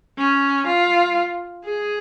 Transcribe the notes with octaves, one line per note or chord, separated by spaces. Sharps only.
C#4
F4
G#4